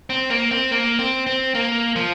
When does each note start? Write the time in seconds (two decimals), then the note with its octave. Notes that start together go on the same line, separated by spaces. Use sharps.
0.10 C4
0.30 A#3
0.51 C4
0.72 A#3
0.99 C4
1.26 C4
1.55 A#3
1.96 F3